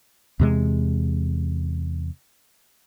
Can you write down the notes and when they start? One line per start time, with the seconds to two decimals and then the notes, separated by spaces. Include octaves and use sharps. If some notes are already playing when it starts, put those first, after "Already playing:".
0.39 E2 C3 G#3